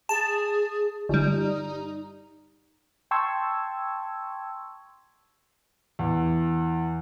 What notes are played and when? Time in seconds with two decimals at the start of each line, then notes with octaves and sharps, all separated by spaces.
0.09 G#4 A5
1.09 G1 G3 D#4
3.11 G5 A5 C6 C#6 E6 G#6
5.99 E2